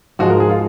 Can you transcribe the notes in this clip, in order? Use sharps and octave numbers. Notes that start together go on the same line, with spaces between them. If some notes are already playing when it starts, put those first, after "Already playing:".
G#2 F3 G#3 F#4
A#4
G#4
F4